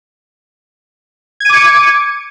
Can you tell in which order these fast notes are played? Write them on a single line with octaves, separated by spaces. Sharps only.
G#6 D#7 D6 C#7